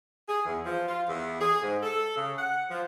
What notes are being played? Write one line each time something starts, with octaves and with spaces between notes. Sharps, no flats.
G#4
E2
F3
F4
E2
G#4
G#2
A4
C#3
F#5
F3